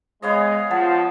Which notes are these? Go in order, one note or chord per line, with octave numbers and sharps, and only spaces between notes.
G#3 B3 C#5 D#5 F5
F3 F#5 A5